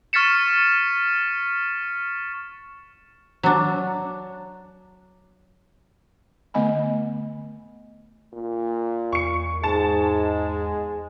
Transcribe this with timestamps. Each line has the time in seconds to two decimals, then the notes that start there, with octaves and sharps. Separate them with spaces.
0.13 C#6 F6 A6 B6 C#7 E7
3.43 F#3 D4
6.54 D3 A3 B3 D#5 G#5 B5
8.33 A#2
9.13 E2 C#6 C#7
9.64 G#2 G#3 A5 E7